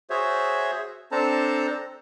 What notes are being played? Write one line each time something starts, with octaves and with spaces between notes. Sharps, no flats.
F#4 G#4 C5 C#5 E5
C4 D4 A4 C5 A5 A#5